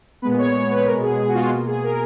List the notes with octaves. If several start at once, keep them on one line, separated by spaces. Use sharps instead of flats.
A#2 G#3 B3 B4
C#5
C#5
B4
B2 G#3 B3 A#4
G#4
G#4
F#4
F4
B2 A#3 F4
G#4
A#4